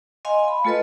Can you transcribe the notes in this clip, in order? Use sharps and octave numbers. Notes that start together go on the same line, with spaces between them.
D#5 F5 G#5 C6
B5
A3 F4 A4 B4 D#5